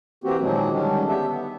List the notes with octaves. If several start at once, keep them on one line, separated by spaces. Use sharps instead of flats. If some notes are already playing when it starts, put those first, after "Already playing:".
E3 A#3 C4 F#4 G4
A#2 D#3 F3 F#3 G#3 A#3
D3 D#3 G3 G#3 C#4 D4
B3 D4 G4 E5
B3